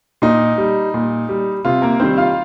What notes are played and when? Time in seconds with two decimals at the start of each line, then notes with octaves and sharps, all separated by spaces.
0.22 A#2 D#4
0.58 G3
0.94 A#2
1.29 G3
1.65 C3 F4
1.82 A#3 A#4
2.00 D#3 G3 C4 C5
2.17 F4 F5